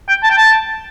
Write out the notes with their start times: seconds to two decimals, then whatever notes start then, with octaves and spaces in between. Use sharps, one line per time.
0.08 G5
0.23 A5
0.30 G5
0.37 A5